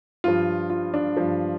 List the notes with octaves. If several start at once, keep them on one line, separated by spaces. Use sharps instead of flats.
G2 F3 F4
F4
D4
G2 F3